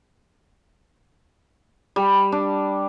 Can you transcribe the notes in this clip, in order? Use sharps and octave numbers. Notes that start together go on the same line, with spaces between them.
G3
D4